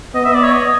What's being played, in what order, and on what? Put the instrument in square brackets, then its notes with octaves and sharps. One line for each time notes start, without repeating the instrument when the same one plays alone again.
[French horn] B3 [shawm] D#5
[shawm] E5
D5
C#5
D#5